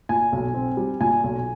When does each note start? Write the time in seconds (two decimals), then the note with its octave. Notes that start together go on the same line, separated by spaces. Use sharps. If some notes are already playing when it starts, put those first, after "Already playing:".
0.09 A#2 G#5
0.32 B1
0.54 C4
0.77 G3
1.00 A#2 G#5
1.24 B1